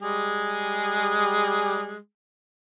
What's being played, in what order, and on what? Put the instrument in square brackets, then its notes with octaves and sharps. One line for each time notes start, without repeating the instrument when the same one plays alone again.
[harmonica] G3 G#3 G#4